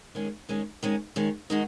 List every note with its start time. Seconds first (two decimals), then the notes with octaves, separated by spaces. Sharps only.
0.15 D#3 G#3 C#4 G#4
0.49 D#3 G#3 C#4 G#4
0.83 D#3 G#3 C#4
1.16 D#3 G#3 C#4
1.50 D#3 G#3 D#4 F#4